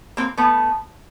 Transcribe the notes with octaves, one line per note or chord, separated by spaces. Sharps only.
A#3 C4
A3 B3